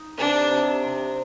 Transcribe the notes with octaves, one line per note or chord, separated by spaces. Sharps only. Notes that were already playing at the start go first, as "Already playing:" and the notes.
Already playing: D#4
C3 D4
C3
C3